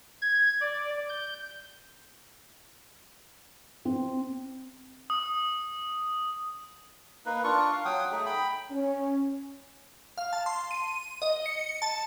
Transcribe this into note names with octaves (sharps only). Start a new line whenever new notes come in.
G#6
D5
G6
C4
D#6
A#3 D#4 B4
D4 F4 C#6
F5
F#3 F#5 G5 D#6
A3 D#4 G#4
G5 B5
C#4
F5
A5
C6
D#7
D#5
C#7
A5